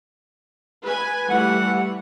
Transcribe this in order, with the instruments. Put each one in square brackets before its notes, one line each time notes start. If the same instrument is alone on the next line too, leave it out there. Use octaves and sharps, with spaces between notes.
[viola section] B4 G#5
[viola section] E3 G3 A3 [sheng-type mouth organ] F#5